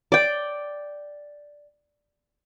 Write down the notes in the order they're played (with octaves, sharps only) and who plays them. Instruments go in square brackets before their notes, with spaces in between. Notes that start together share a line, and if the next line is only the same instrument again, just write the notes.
[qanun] D5 G5